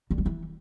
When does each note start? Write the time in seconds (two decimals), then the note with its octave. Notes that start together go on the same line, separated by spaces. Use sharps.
0.10 D3
0.18 G3
0.26 E3